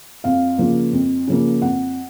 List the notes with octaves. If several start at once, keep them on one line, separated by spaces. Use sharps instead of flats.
F2 F5
C#3 F3 A#3
F2
C#3 F3 A#3
F2 F#5